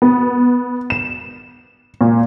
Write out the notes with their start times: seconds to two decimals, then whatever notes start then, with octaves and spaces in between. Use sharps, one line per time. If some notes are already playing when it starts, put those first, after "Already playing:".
0.02 B3
0.90 E7
2.01 A#2